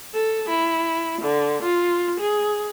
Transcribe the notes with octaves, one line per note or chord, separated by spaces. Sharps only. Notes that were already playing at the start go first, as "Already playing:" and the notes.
A4
E4
D3
F4
G#4